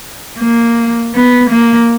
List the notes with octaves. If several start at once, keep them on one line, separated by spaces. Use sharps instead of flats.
A#3
B3
A#3